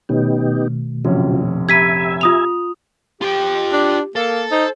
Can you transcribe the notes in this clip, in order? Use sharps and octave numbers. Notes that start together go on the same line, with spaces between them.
B2 D#3 A3 B3 C#4 D#4 G4
F1 A#1 C#3 F3 F#3 C#4
G4 E5 G#5 A#5 B5 G#6 B6 D#7
F4 D#6 F7
F4 G4 G5
D4
A#3 A4
D#4 C5